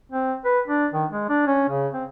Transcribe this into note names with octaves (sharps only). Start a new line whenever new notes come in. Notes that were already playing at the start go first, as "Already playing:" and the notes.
C4
B4
D4
D#3
G#3
D4
C#4
C#3
C4